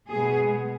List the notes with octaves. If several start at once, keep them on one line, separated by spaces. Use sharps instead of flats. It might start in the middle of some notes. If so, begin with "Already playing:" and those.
B2 G#3 B3 G#4